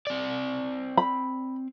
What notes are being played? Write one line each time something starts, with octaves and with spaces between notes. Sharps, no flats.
C4 D5
B5